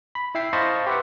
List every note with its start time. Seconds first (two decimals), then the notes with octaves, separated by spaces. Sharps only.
0.15 B5
0.35 E4 E5 G5 C7
0.53 C5 D#5 F5 A5 B5 C#6
0.87 G4 B4 E5 F#5